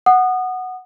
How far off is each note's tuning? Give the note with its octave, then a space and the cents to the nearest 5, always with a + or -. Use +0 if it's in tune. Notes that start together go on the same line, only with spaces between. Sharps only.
F#5 +0 D#6 -25